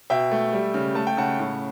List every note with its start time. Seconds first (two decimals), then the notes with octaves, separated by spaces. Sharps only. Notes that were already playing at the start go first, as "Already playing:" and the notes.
0.10 B2 E5 G5
0.31 A3
0.53 G3
0.74 C#3
0.95 A3 A5
1.07 G5
1.17 C#3 F#5 A5
1.39 A2